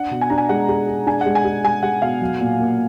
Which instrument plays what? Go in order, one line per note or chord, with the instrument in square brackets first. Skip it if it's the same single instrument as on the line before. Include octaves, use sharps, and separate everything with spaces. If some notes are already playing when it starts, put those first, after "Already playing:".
Already playing: [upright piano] D4 [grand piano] F#5
[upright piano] B2
[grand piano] G#5
[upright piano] D4 [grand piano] A#5
[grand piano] G#5
[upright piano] G#3 [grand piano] F#5
[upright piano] G#4
G#4
[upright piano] D4 [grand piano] G#5
[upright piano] G#3 [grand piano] F#5
[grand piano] G#5
[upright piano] G#4
[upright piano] G#3 [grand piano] G#5
[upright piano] G#3 [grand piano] F#5
[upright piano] B2 [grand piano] F5
[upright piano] F#3
A#2
A#3